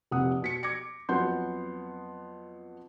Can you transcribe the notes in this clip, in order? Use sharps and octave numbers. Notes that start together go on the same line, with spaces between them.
F1 C3 F#5 D#6
B2 B6 C#7
D6 G#6 A#6 C#7
F2 F#3 B3 F#5 C6 G6